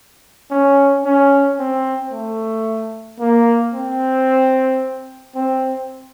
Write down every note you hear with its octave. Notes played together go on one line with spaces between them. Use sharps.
C#4
C#4
C4
A3
A#3
C4
C4